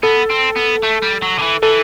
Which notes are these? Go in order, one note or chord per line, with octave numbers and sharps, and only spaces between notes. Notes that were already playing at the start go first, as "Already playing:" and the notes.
B3 A4
C4
B3
A3
G3
F#3
D3
E3
E3 A4